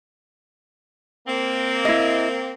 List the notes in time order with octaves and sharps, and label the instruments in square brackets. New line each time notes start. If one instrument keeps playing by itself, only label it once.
[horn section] A#3 C4
[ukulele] E4 D#5